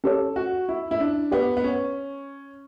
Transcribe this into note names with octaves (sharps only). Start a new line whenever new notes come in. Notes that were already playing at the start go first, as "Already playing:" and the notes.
C#4 G4 A4 C#5
F#4
E4
E4
D4
B3 G4 D5 G5
B3
C#4